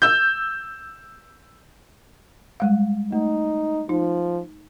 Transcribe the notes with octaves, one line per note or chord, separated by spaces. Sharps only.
E6 G6
G3 G#3 F5
A3 D#4
F3 D#4